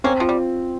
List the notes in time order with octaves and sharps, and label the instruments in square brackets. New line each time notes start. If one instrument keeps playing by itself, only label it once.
[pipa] A#3 C#4 [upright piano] C4
[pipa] F3 [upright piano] F4
[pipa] G3